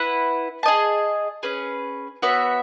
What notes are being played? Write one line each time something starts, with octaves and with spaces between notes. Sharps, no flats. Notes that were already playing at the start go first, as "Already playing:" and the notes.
Already playing: E4 B4 F#5
G#4 D#5 A5
C#4 G#4 B4
B3 F#4 C#5 E5